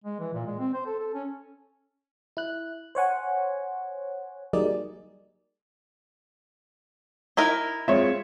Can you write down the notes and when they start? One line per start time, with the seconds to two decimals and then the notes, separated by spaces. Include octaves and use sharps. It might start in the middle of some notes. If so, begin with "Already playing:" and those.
0.04 G#3
0.20 E3
0.33 A#2
0.46 G#3
0.59 C4
0.74 C5
0.86 A4
1.00 A4
1.14 C#4
2.37 E4 F#6
2.95 C5 C#5 F#5 G#5
4.53 F#3 G3 A#3 D#4 G#4 D5
7.37 D#4 E4 A#4
7.88 G#3 C4 F4 C#5 E5